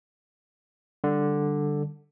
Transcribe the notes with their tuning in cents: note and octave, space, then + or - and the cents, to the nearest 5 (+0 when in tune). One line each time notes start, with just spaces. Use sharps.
D3 +5 G3 +0